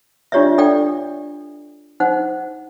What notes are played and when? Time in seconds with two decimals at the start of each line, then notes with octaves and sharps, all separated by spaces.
0.32 D4 F4 G4 C#5 D5 E5
0.58 D4 A4 D5 G5
2.00 D#4 C5 F#5